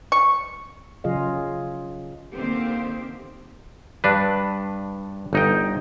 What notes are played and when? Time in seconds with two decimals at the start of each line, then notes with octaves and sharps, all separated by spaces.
0.12 C#6
1.04 C#3 F#3 F4 G#4 D#5 F5
2.32 D3 D#3 A#3 C4 G4 C5
4.04 G2 D4 B4
5.33 G1 D#4 G5